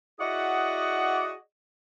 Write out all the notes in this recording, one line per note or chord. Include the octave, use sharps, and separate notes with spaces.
E4 F#4 G#4 D5 D#5 F#5